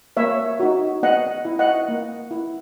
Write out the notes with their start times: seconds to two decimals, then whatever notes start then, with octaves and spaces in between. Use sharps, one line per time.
0.17 A#3 C#5 E5
0.60 D#4 F#4
1.03 B3 D#5 F#5
1.45 E4
1.59 D#5 F#5
1.88 A#3
2.31 E4